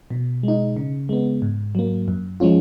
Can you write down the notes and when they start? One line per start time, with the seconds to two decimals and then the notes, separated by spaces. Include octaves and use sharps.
0.10 B2
0.43 G#3 D#4
0.77 C#3
1.09 G#3 B3
1.42 G#2
1.75 F#3 A#3
2.08 F#2
2.40 F3 G#3 C#4 F4